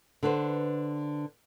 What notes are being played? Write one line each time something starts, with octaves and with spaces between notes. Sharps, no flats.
D3 B4 C5